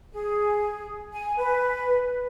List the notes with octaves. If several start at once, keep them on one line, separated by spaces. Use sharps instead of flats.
G#4
G#5
B4